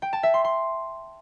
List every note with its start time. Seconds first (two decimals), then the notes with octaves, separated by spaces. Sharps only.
0.02 G5
0.13 A5
0.23 E5
0.34 C6
0.44 C6